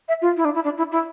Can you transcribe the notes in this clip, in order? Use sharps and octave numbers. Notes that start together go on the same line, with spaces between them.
E5
F4
E4
D4
E4
D4
E4
E4